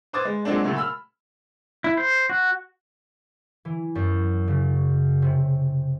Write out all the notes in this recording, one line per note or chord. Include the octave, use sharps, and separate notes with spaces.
B4 C5 D6 D#6 G#6 A6
G#3
F3 F#3 G#3 A#3 C4 D4
A#2 C#3 F#3 A3
B5 E6 F6
E4
C5
F#4
E3
F#2
C#3
C3